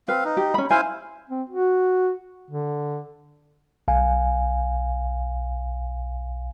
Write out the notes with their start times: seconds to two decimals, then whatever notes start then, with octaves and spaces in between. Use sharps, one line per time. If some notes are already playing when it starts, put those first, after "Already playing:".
0.08 C4 B4 F5
0.25 D#4
0.37 G4
0.54 C#4 B5
0.71 E4 C5 F5 G#5
1.29 C4
1.50 F#4
2.50 D3
3.88 B1 F5 G#5